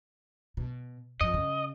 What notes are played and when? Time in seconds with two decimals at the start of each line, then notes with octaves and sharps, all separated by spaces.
0.57 B2
1.21 F2 D#5
1.34 C#3